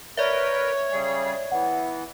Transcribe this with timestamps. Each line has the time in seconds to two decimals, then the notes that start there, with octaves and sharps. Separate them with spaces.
0.17 A#4 B4 C#5 D5 E5
0.91 C#3 G3 G#4
1.52 E3 B3 F#5